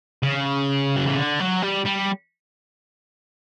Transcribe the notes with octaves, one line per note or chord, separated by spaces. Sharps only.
C#3
F#3
E3
D3
F#3
G3
G3